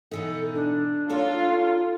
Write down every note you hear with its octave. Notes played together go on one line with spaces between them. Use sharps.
B2 E3 D#4 A4
D4
D#4 F4 A4 C#5